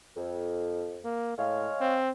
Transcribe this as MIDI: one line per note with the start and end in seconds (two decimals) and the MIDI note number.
0.17 1.03 41
1.05 1.38 58
1.38 1.67 45
1.38 1.97 56
1.38 1.97 73
1.38 1.97 77
1.81 2.10 60